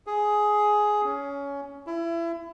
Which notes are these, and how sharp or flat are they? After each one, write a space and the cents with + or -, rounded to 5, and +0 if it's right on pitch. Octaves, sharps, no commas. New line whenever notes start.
G#4 +10
C#4 +20
E4 +30